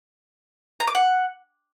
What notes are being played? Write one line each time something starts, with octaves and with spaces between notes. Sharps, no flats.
A#5
D6
F#5